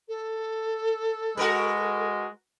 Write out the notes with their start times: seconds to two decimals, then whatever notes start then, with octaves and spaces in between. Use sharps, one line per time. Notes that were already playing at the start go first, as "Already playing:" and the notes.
0.08 A4
1.37 G#3 F#4 A#4 B4